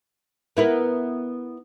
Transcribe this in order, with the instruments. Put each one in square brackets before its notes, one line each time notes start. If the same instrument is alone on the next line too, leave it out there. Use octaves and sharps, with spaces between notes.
[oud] B3 E4 A#4